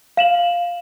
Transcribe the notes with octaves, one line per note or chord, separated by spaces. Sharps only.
F5 E7 F#7